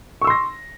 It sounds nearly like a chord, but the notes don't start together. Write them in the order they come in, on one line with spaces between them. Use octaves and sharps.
C#6 E6 C6 A#6